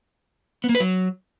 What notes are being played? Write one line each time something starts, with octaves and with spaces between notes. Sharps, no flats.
B3
A#3
B4
F#3